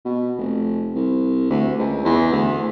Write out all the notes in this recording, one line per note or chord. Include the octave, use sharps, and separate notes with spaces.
B2
F1
C2
D2
C#2
E2
D2